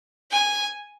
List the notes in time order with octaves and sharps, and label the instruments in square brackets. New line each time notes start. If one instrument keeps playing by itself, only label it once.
[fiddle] G#5